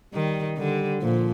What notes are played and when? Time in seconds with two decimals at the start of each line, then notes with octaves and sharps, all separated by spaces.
0.14 D#3 G3
0.58 D3 G3
1.02 A#2 F3